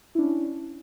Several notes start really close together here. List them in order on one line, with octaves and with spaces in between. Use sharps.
E4 D4 C#4